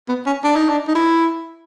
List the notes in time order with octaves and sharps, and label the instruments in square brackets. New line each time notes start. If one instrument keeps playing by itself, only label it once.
[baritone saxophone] B3
C#4
D4
D#4
D4
D#4
E4